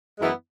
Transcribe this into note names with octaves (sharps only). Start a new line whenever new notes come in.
F#2 E3 G#3 B3 E4